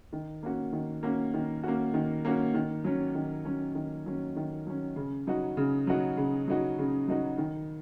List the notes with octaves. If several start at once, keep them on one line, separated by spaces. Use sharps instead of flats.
D#3
A#3 C#4 F#4
D#3
A#3 C#4 F#4
D#3
A#3 C#4 F#4
D#3
A#3 C#4 F#4
D#3
F#3 C#4
D#3
F#3 C#4
D#3
F#3 C#4
D#3
F#3 C#4
C#3
F#3 D#4 F#4
C#3
F#3 D#4 F#4
C#3
F#3 D#4 F#4
C#3
F#3 D#4 F#4
D#3